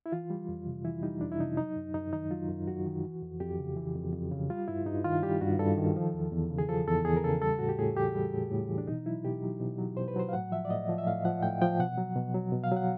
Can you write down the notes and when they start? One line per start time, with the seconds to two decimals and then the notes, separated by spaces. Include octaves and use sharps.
0.06 E4
0.12 E3 F4
0.30 G3
0.48 F2
0.67 C3
0.85 E3 E4
1.03 G3 D#4
1.21 F2 D4
1.32 E4
1.40 C3 D#4
1.57 F#3 D#4
1.76 F#2
1.94 F#2 D#4
2.13 D#3 D#4
2.31 F#3 F4
2.49 F#2
2.67 F#2 F#4
2.86 D#3
3.03 E3
3.22 F2
3.40 F2 G4
3.59 C#3
3.77 E3
3.95 F2
4.13 F2
4.32 C#3
4.50 G3 F4
4.68 G2 E4
4.86 G2 D#4
5.05 D#3 F4
5.22 G3 G4
5.41 G2 F#4
5.59 G2 A4
5.77 D#3
5.96 F3
6.14 E2
6.32 E2
6.51 C#3
6.58 G#4
6.69 F3 A4
6.87 E2 A4
7.05 E2 G#4
7.17 A#4
7.24 C#3 A4
7.42 G3 A4
7.59 A2 F#4
7.69 G4
7.78 A2 G#4
7.97 E3 G4
8.15 G3
8.33 A2
8.51 A2
8.69 E3
8.78 D4
8.87 B2 D#4
9.06 F#3 E4
9.24 B2 G4
9.43 F#3
9.60 B2
9.78 F#3
9.97 B2 C5
10.08 B4
10.16 F#3 C5
10.29 F5
10.33 A2 F#5
10.52 F3 E5
10.65 D5
10.70 A2 D#5
10.89 F3
10.98 E5
11.07 A2 F5
11.25 F3 F#5
11.43 A2 G5
11.62 F3 G5
11.80 B2 F#5
11.97 F#3
12.16 B2
12.34 F#3
12.52 B2
12.64 F5
12.71 F#3
12.77 F#5